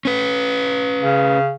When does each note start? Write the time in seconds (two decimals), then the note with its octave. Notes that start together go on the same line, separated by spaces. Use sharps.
0.05 C#4 B4
1.01 C#3